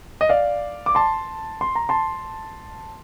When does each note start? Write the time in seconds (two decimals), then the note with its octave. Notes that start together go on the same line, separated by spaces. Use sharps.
0.21 D#5
0.29 D5 F5
0.86 D6
0.95 A5 C6
1.61 C6
1.75 A#5
1.89 A5 C6